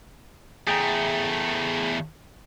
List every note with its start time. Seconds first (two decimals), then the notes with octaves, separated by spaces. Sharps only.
0.67 E2 A3 G#4 G5 A#5